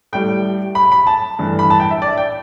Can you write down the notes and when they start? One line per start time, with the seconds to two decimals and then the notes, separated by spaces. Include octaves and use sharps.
0.13 A2 G3 G5
0.75 B5
0.92 B5
1.07 A5
1.39 G2 E3 A3
1.59 B5
1.70 A5
1.80 G5
1.90 E5
2.02 D5
2.18 G5